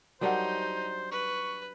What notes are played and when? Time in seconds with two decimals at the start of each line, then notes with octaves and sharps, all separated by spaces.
0.21 F#3 G3 D4 D#4 A#4 C5 D5 F#5
1.11 B4 C#6